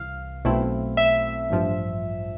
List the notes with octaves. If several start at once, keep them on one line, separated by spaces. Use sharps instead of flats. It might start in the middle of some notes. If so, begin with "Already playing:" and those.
Already playing: C2 C3 E3 F5
B1 B2 A3 C4 E4
E5
A1 G2 F3